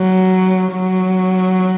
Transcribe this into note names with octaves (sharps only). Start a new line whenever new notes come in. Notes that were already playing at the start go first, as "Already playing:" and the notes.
Already playing: F#3
F#3